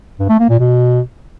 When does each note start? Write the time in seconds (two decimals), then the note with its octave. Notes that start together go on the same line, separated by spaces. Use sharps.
0.19 G2
0.29 A3
0.39 A#3
0.49 A#2
0.60 B2